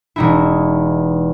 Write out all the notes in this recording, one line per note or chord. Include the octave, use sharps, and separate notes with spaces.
E1 D#4 E4